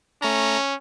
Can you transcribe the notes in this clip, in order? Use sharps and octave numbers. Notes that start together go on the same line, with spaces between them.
A3 C#4 A#5